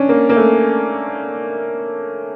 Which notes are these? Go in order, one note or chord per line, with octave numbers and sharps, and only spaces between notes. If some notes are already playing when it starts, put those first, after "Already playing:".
Already playing: C#4 D4
A#3
A#3
A3